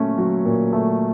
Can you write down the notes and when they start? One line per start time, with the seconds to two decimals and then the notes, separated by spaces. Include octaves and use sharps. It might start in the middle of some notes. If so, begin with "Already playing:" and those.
Already playing: A#2 F#3 A3 C#4
0.18 F#3
0.45 A#2
0.73 A3